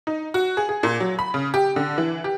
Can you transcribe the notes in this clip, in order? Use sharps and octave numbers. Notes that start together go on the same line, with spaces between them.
D#4
F#4
G#4
G#4
A#2
F#3
B5
C#3
G4
D3
E3
G4